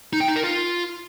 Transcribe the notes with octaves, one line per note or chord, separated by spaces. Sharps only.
D#4
G5
D#4
A#4
F4